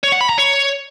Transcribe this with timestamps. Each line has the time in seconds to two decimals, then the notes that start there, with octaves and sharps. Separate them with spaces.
0.04 C#5
0.12 F#5
0.21 B5
0.29 A#5
0.38 C#5